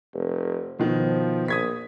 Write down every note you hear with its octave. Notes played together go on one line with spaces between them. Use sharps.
F1
B2 D#3 F3
A#1 D#6 G#6 B6